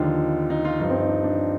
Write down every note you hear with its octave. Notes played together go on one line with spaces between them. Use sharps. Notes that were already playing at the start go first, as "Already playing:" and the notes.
Already playing: D#2 D3 F3 D4 D#4 F4
D#4
F4
G2 F3 D#4
C4
D#4
D4
D4